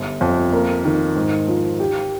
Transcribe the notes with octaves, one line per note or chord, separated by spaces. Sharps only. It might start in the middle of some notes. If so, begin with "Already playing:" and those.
Already playing: G1
F2
A#3
D#3
G#2
F3
G4